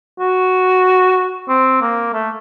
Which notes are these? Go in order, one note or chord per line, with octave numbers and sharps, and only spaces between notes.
F#4
C4
A#3
A3